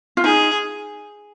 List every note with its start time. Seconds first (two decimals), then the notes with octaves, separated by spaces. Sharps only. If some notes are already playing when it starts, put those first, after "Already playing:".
0.17 F4
0.24 D#4 G#4